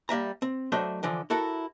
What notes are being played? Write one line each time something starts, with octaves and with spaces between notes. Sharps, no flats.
G3 A#3 E5 A#5
C4
F#3 A3 D4 C5 D#5 E5
D3 E3 F3
E4 F#4 A4 A#4